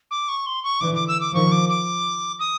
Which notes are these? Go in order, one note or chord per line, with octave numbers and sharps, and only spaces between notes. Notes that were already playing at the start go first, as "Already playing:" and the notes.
D6
C#6
C6
C#6
D3 E3 D6
D6
E6
D6
D#3 F3 C#6
D6
D6
D#6